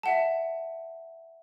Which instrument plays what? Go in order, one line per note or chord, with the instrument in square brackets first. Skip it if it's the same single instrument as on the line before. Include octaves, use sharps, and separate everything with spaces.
[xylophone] E5 F#5 A5